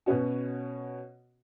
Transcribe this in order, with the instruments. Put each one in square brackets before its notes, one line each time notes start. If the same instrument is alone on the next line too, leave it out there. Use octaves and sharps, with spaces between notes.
[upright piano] B2 B3 C#4 F#4